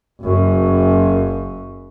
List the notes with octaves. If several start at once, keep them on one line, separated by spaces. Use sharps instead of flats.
F#1 F#2